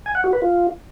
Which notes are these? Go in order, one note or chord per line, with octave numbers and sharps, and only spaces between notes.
G#5
F#5
F#4
B4
F4